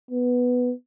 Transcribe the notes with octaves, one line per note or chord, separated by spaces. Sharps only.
B3